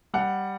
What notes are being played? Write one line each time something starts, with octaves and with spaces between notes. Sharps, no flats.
G3 F#5